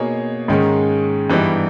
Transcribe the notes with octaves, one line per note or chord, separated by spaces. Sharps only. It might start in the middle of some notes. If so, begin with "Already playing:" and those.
Already playing: B2 A#3 D#4 G#4 C#5
G#2 D#3 G#3 C#4
G2 E3 G3 B3 D#4